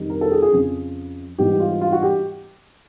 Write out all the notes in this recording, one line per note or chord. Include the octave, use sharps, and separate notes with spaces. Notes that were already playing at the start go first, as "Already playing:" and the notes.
Already playing: F2 C3 D#3 G3
A#4
A4
G#4
G#4
F2 C#3 F3
G#2 E3 G3 B3 G4
F4
F4
F#4
G4